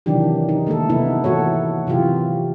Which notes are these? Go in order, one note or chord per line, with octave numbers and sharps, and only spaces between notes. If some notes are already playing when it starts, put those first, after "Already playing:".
C3 D#3 E3 F#3 D4 G4
D#4
D#3 A3 A#3 A4
C3 F3 A3 B3 D#4 E4
E3 A3 F#4 A4 C#5
C3 E3 F#3 F4 G4